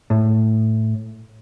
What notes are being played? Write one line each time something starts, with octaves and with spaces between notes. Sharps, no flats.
A2